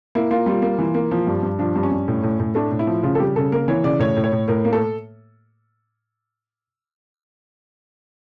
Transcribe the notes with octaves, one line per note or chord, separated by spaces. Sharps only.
A#3 E4
A#3 F4
G3 F4
A#3
E3
A#3
F3
G2
G2
F3 D4
G2
C#4
G2
A2
A2
A2
A3 D4
A2
E4
F3
C#3 F4
A4
G3 G4
C#3 A4
A#3 A#4
E3 C#5
C#3 D5
A2 C#5
A2
C#5
A2
A2 A#4
A#3
A4